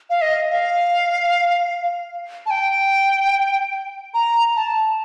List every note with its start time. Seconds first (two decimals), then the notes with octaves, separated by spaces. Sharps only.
0.10 F5
0.22 D#5
0.50 F5
2.46 A5
2.50 G5
4.14 A#5
4.56 A5